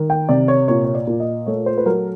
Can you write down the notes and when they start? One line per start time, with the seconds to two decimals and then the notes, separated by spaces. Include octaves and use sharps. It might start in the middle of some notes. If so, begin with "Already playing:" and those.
Already playing: D#3
0.10 G5
0.29 C3 D5
0.48 C#5
0.68 A#2 C#5
0.84 C#5
0.95 D5
1.07 A#2
1.20 D#5
1.46 A3 C#5
1.66 C5
1.78 B4
1.86 F#3 A#4